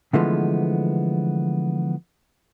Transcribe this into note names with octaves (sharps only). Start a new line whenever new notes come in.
D3 E3 F3 G#3 A3 B3